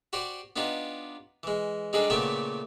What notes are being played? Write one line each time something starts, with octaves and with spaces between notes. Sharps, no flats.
F#4 G4 C5 D5
B3 D4 D#4 F4 G4
E3 G#3
G3 G#3 D4 D#4 G#4 A4
A#2 C#3 A3 B3 G4 E5